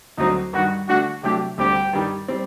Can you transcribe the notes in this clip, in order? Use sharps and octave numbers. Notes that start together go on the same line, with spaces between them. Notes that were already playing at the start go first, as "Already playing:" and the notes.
D2 D3 F#3 C4 D#4 F#4
G2 D#3 G3 F#4
D3 A3 D4 F#4
C3 F#3 A3 D4 G4
D2 D3 G3 C4 G4
G2 D#3 G3
G3 C4